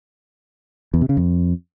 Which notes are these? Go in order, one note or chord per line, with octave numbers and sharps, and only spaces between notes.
E2
C3
C#3
F2